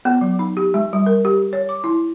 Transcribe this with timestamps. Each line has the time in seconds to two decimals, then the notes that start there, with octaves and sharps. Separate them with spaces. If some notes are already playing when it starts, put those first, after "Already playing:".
0.05 B3
0.21 F#3
0.39 D#4
0.57 G4
0.74 G#3
0.93 G3
1.06 A#4
1.25 G4
1.53 C#5
1.69 D6
1.84 E4